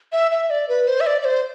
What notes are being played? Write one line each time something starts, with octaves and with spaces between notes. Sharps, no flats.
E5
E5
D5
B4
C5
E5
D5
D5
C5